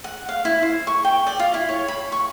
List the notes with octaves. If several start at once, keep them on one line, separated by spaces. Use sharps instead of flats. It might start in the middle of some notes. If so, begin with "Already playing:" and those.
F#5
F5
E4
C5
C#6
G5
D5
F4
E4
C#5
B5
C#6